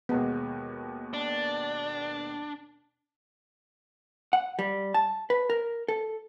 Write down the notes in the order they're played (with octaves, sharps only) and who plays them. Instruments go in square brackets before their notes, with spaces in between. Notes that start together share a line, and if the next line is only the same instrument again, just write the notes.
[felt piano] D#2 B2 G#3 [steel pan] B3
[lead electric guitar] D4
[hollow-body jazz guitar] F#5
G3
A5
B4
A#4
A4